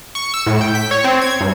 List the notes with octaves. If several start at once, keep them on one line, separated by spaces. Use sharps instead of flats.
C#6
E6
A2
G5
B6
C#5
C4
G#6
G2